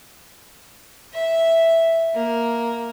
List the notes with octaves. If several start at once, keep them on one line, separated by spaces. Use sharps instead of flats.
E5
A#3